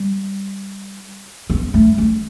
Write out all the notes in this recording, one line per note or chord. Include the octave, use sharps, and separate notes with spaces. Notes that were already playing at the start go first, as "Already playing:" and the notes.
Already playing: G3
B3
A3
A3